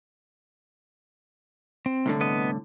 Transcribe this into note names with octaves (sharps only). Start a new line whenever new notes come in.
C4
C2 A2 D3
B3 D#5